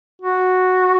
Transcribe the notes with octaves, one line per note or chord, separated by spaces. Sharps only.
F#4